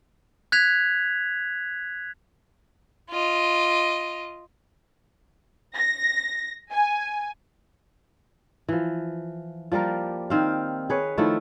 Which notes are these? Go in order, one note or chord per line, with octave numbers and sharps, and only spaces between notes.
F#6 G#6 B6 F7
F4 D#5
A#6
G#5
E3 F3
F3 G3 A#3 A#4
D#3 C4 F5
G#4 B4 C#5
D#3 F3 A3 E4